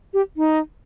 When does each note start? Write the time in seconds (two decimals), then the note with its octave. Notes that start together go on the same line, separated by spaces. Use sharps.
0.14 G4
0.37 D#4